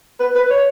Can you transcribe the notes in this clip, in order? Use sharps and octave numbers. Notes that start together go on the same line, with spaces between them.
B4
B4
C#5